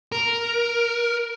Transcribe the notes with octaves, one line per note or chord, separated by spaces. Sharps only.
A#4